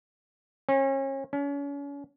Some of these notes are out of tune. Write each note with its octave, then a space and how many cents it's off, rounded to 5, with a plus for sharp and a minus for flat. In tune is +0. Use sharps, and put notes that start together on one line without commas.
C#4 -35
C#4 +35